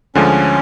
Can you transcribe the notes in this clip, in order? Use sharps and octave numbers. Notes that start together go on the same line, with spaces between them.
D2 D3 F3 G#3 C#4